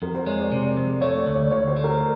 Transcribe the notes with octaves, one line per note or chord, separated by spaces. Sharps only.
F2 A#4
C5
G#3 C#5
D5
C3
F2
A3 C#5
D5
D2
C#5
D2 C#5
C5
A3
A#4